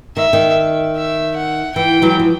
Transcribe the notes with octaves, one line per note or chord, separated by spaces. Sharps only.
D#3 E5
D#3
E5
F#5
E3 G5
E3 F#3
F3